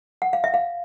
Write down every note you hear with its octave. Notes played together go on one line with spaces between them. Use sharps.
F#5
F5
E5
F5